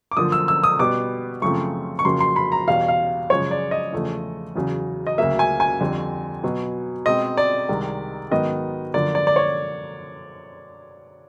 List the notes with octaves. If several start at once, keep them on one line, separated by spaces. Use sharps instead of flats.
D6
F#2 D3 F3 A#3 D#6
E6
E6
D#6
B2 G3 B3 D6
F#2 C#3 F3 A3 C4 C#6
C#6
F2 C#3 F#3 A#3 C6
C6
B5
A#5
E2 B2 G3 F5
F5
F#2 C#3 F3 G#3 C#5
D5
D#5
E2 C#3 F3 A3
E2 C#3 F#3
D#5
D2 C#3 F#3 A#3 E5
G#5
G#5
F2 D3 G3 C4
B2 F#3 B3
B2 G#3 C4 D#5
D5
C2 C3 D#3 G#3
G#2 D#3 F#3 B3 D#5
F#2 D3 F3 A#3 D5
D5
D5
C#5